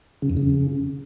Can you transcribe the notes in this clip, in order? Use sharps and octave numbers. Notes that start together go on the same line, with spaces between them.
C#3
F2
C#3